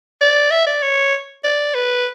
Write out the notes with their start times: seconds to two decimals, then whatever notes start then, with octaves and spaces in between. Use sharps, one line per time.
0.21 D5
0.51 E5
0.67 D5
0.83 C#5
1.44 D5
1.74 B4